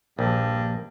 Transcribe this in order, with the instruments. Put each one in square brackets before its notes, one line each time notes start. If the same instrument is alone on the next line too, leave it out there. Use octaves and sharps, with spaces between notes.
[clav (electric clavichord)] A#1 [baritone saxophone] G2